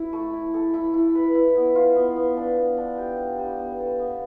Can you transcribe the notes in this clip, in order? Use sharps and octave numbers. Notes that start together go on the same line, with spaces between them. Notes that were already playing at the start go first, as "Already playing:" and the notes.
Already playing: E4
A3
E4
A4
E4
E4
B4
E4
B3
F4
B3
B3
D4
B3
D4
G4
D4
G3
B3
A4
B3